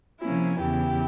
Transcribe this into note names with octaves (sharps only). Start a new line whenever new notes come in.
C3 F3 A#3 C#4 E4
E2 C#3 E3 E4 G4